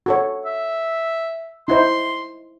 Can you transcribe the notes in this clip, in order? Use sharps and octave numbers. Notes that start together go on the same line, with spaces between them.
F#4 A4 C#5
E5
D#4 E4 C5 C6